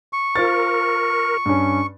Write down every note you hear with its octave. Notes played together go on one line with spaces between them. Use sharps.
C#6
F4 A#4 C5 A6
G2 C#4